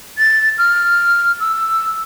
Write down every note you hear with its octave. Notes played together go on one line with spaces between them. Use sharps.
A6
F6
E6